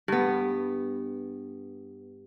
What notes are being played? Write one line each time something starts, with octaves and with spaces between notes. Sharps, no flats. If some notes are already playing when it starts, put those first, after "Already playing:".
G2 B3